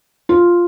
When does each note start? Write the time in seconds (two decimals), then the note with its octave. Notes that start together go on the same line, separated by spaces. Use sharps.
0.29 F4